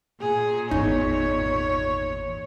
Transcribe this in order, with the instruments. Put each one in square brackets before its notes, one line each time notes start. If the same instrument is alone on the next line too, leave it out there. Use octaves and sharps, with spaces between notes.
[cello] A#2 [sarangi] G#4
[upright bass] G#1 E2 [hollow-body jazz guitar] D#4 [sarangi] C#5